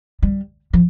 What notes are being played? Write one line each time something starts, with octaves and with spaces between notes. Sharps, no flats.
G3
F3